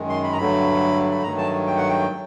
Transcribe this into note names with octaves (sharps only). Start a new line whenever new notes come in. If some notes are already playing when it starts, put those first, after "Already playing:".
Already playing: F#2 D#3 G#3
C6
B5
A#5
G2 D3 F#3 A3 B5
B5
G2 D#3 F#3 A3 A#5
A5
G5
F#5
G5
F#3 A3